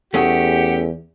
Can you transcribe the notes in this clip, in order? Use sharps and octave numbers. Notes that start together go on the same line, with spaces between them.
E2 A3 C#4 G4 G#4 F#5